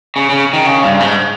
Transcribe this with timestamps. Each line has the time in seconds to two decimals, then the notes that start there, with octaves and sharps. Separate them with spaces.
0.16 C#3
0.29 C#3
0.53 D#3
0.67 C#3
0.83 G2
1.00 G#2